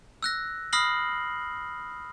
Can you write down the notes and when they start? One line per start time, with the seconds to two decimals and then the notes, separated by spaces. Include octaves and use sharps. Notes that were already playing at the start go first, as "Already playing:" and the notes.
0.23 E6 F#6 A#6
0.73 B5 D#6 F6 A#6 C7 F#7